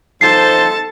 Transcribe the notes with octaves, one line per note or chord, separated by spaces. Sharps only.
F3 D#4 A4 C5 A5 C7